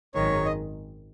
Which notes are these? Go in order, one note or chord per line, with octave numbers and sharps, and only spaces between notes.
G#1 F#2 D#3 G#3 C#5
D#5